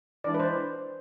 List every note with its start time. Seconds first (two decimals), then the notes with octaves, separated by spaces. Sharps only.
0.24 E3 G#3 D4 D5
0.34 B4
0.40 C5